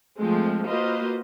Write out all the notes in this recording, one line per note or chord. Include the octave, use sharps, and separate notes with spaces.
F3 G#3 A3 C4
A#3 F4 F#4 B4 C5 D#5